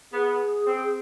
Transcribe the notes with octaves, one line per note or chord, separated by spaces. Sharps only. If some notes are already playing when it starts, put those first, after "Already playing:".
B3 G#4
C4